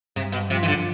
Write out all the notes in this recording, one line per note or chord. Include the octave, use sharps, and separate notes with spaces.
G2 C3
B2
C3 F3
E3
D3